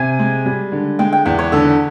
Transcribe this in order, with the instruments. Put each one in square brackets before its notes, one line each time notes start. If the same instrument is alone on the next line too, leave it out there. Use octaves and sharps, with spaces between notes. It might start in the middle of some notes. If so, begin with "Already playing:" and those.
Already playing: [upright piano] C3 [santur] G#5
[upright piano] G#3
G3
D3
[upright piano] G#3 [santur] G5
[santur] G5
[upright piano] E2 [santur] F#5
[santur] C#5
[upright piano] D3 [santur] A4